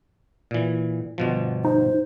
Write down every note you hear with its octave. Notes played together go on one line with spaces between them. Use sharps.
A#2 E3
G1 B2 F3
D#4 C5